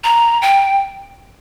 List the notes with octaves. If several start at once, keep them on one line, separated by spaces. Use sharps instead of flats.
A#5
G5